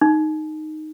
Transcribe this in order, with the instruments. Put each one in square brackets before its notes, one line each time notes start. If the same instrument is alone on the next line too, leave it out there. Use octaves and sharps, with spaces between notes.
[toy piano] D#4